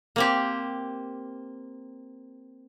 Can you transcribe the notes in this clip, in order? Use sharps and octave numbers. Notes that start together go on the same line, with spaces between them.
A#3 C4 G4